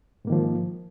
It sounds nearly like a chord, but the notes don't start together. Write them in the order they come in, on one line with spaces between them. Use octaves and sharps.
G#2 A#3 D#3 F3